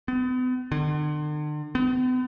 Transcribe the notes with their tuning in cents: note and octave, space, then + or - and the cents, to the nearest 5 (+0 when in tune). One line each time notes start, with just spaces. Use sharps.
B3 +40
D3 +40
B3 +45